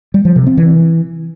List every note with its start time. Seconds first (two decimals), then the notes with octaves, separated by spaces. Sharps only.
0.14 G3
0.25 F3
0.36 C3
0.47 C4
0.57 E3